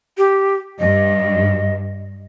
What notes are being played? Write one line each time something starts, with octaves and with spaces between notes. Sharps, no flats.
G4
G2 D#5